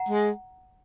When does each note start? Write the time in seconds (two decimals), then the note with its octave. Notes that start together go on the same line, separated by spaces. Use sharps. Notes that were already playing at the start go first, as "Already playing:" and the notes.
Already playing: F#5 A#5
0.09 G#3